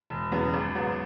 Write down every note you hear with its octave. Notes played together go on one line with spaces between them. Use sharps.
E1
E2 C#3 F#3 B3
G#1
G#2 F#3 B3